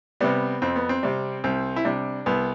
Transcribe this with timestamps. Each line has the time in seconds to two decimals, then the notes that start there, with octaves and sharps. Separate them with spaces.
0.21 C3 G3 B3
0.62 F2 C4
0.76 B3
0.89 C4
1.03 C3 G3
1.44 C2 C4
1.76 E4
1.85 C3 G3 D4
2.26 C2 B3